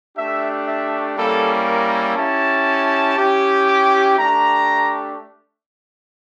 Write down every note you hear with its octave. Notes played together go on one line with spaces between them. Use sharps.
A3 D4 G4 E5
E5
G3 A#3 C#4 E4 A4
A#4
C#4 E4 G4 A5
C#4 E4 G4
D6
A3 D4 G4 A#5